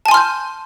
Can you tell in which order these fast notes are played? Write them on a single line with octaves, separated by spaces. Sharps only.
A5 G#5 C6 F6 G6